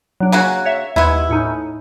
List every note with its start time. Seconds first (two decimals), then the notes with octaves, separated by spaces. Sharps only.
0.20 F#3 D4
0.32 C#3 A#3 F#4 G#5 F#6 G#6
0.65 C#5 E5
0.96 D#2 G#3 B3 E4 G#6
1.29 A2 C#4 D#4